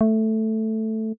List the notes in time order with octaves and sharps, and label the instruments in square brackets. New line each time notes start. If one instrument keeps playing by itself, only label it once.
[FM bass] A3